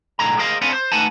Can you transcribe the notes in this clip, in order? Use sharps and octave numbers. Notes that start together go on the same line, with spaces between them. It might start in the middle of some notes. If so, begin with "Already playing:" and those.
B1 E2 A2 D3 G#3 A#5
G#4 A#4 C5 D#5 F5
B3 C4 D4 A4 F5 G#5
C5
A3 D#4 B4 F#5 G#5 A5